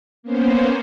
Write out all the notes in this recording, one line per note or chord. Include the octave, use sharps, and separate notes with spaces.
A#3 B3 C#4 C5